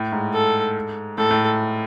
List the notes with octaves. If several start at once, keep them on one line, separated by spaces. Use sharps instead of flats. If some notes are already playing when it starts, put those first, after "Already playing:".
Already playing: A2
G#2
A4
A2 A4
A2